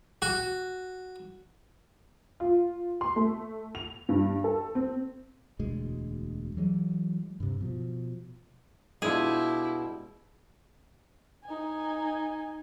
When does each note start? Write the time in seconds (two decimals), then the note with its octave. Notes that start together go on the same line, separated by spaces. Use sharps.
0.22 F#4
2.40 F4
3.01 C6
3.16 A3
3.75 F7
4.09 G2
4.44 A4
4.75 C4
5.59 E1 D2 B2 G#3
6.57 E3 F#3 G#3
7.40 G2 C3
7.61 B2 F3
9.02 B2 G#3 D4 E4 F4 G4 G#4
11.45 D#4 G#5